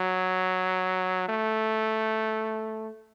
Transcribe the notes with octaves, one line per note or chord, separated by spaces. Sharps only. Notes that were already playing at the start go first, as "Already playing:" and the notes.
Already playing: F#3
A3